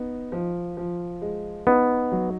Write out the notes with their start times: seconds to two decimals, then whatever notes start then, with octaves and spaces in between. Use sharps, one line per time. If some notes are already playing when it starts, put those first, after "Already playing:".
Already playing: B3 D#4
0.32 F3
0.77 F3
1.22 G#3
1.67 B3 D#4
2.12 F#3